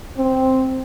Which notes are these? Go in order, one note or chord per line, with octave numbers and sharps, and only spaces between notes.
C4